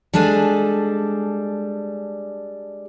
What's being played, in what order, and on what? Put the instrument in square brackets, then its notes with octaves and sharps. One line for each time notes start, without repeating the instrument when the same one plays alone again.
[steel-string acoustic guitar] G3 G#3 D4 A4 G#5